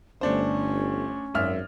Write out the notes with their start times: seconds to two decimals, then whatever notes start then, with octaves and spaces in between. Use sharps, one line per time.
0.21 G1 A3 C#4 D4 C5
1.34 G#1 F#2 E5 F6